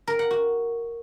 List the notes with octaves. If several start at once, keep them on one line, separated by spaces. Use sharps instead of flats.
A#4
F#5
F#4